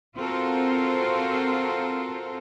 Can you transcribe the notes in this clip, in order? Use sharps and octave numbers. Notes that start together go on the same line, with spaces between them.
C4 F4 F#4 A4 A#4 C5